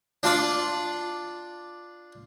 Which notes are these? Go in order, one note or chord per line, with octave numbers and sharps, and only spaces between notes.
D4 F4 D5